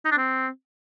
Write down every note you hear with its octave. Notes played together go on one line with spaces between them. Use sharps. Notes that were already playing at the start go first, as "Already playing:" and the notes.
D#4
D4
C4